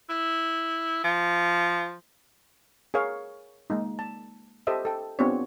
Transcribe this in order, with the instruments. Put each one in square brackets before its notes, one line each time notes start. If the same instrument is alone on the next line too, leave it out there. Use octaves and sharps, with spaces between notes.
[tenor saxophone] E4
F3
[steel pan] G#4 A#4 C#5 F5
G#3 A#3 D#4
A5
G4 A4 C5 D#5 E5
A4 G5
B3 C4 D4 F4 G4 C#5